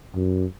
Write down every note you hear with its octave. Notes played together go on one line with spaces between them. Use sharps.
F#2